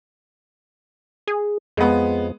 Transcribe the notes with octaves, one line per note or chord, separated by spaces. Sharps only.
G#4
F2 G#3 B3